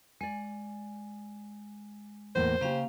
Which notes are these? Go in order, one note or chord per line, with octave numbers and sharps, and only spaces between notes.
G#3 D5 G#5
E2 A2 A#3 C5
C#3 A#3 G4 F5